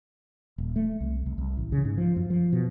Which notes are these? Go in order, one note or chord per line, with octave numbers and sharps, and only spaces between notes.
D#1
A3
C2
C2
C2
A1
C#3
G#2
F3
F#2
F3
B2